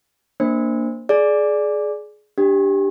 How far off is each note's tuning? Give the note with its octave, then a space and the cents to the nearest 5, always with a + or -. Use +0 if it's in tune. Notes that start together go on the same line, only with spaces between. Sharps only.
A#3 +0 D4 +0 C5 +0
G#4 +20 D5 +0
D4 +0 G4 +0